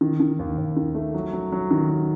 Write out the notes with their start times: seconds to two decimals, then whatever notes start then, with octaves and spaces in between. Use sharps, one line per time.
0.01 D#3
0.20 D#3
0.39 D#2
0.58 D#2
0.77 D#3
0.95 A3
1.14 F#3
1.33 F#3
1.52 F#3
1.71 D#3
1.89 F#3